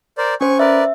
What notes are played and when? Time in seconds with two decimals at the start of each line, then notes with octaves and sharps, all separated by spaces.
0.18 A#4 C5 D5
0.41 C#4 C5 G#5 C#6
0.59 A#4 B4 D5 E5